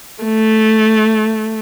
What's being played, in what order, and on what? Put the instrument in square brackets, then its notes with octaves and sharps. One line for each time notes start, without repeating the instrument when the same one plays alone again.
[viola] A3